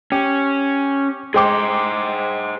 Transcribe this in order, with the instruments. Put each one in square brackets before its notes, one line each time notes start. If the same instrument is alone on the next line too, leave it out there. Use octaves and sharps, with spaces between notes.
[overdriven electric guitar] C#4 [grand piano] G4
[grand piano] G#3 G5 D6 [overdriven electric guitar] G#4 C5